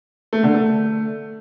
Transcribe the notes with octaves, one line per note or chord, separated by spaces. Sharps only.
A3
D3
A3